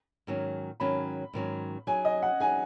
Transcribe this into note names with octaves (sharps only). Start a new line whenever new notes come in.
G#2 D#3 F#3 C#4
G#2 D#3 F#3 C#4 B5
G#2 D#3 F#3 C#4
F#3 D#4 G#4 G#5
D#5
F#5
F#3 D#4 G#4 G#5